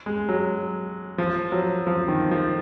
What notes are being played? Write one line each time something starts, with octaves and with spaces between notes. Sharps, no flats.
G#3
F#3
F3
F#3
F3
D#3
F3